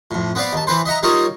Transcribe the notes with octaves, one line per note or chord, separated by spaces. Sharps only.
F2 A2
B3 C4 B4 D5 F5
D#2 A5
E3 C4 B4 C5
D#5 E5 F#5 A#5
G3 A#3 D#4 F4 C#5 D#5